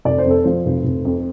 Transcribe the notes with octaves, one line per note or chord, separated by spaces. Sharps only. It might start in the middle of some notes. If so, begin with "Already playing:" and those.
F1 D5
C5
F2
A4
F3 C5
F1
F1
F2